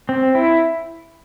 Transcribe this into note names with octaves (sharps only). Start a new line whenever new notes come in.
C4
E4